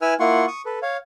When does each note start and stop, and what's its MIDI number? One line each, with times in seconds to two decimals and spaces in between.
0.02 0.14 64
0.02 0.14 71
0.02 0.14 80
0.02 0.14 88
0.02 0.14 89
0.20 0.46 58
0.20 0.46 64
0.20 0.46 65
0.20 0.46 78
0.20 0.46 84
0.20 0.46 85
0.47 0.62 85
0.47 0.62 87
0.66 0.79 69
0.66 0.79 71
0.82 0.97 73
0.82 0.97 77